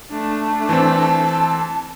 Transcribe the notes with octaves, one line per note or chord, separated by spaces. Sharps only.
A3 D4
E3 C4 A5